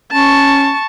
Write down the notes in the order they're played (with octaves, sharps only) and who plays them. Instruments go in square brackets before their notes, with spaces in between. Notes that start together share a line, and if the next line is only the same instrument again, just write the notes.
[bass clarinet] C#4 [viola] A5 C#6